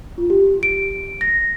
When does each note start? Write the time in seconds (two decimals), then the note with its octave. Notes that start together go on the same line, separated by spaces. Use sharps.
0.18 F4
0.30 G4
0.63 D7
1.21 A#6